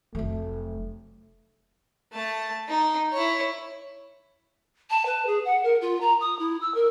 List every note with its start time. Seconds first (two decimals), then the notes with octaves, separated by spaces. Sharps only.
0.15 F1 F#3 A3
2.13 A3 A5
2.68 D#4
3.13 E4 C#5
4.90 A5
5.06 B4
5.26 G#4
5.45 F#5
5.64 A#4
5.81 F4
6.01 A#5
6.20 D#6
6.39 E4
6.61 E6
6.74 A#4